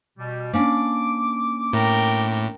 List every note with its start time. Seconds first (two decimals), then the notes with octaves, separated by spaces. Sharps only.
0.18 B2 G3
0.53 A#3 C#4 D4 D6
1.73 A2 A#4 G5